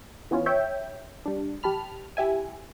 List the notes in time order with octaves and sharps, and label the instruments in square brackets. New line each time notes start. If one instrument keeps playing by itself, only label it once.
[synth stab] E3 B3 C#4 F4
C#5 E5 G5 G6
G3 D4
A#1 G4 A5 B5 F6
E4 G4 E5 G#5